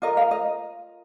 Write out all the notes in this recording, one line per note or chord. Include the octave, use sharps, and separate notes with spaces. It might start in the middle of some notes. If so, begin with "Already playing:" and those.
F4 A#4 D#5
F5
D#5